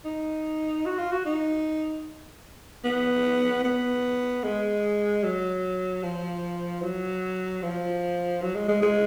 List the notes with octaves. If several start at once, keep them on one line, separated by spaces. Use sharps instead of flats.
D#4
F#4
F4
F#4
D#4
B3
B3
G#3
F#3
F3
F#3
F3
F#3
G#3
G#3
G#3